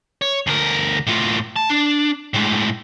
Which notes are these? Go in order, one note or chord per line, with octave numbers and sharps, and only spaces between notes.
C#5
D2 A#4
A2 F4
A5
D4
A2 G#3